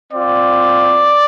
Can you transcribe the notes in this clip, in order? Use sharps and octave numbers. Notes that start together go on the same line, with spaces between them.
C4 F4 D5